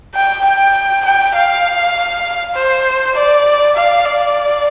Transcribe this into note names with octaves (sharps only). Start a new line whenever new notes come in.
G5
G5
G5
F5
C5
D5
F5
D5